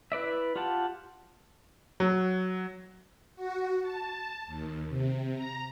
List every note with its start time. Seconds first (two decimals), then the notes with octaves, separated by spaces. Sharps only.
0.12 E4 B4 D5 E5
0.56 F4 G4 F#5 A5
2.00 F#3
3.35 F#4
3.82 A5
4.47 D#2
4.89 C3
5.34 A#5